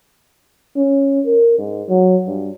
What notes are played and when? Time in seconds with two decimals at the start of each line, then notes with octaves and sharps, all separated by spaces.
0.76 C#4
1.25 A#4
1.58 G#2
1.89 F#3
2.26 G2